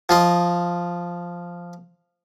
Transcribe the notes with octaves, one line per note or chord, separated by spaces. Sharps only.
F3 F4 D#5